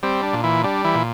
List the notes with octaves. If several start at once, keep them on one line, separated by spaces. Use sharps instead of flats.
G3 C4
D4
A#2
E3 E4
G3 D4
E3 E4
A#2